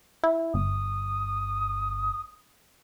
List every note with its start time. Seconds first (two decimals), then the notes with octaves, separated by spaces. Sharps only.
0.24 E4
0.54 G1 D#6